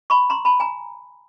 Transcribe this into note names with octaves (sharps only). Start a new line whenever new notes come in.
B5 C#6
A#5 C6
A5 B5
G#5 A#5